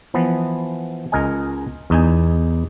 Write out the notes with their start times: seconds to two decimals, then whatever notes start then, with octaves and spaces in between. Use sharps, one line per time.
0.14 E3 F3 B3
1.12 C#2 A#4 D#5 G#5
1.90 E2 D#4 G#5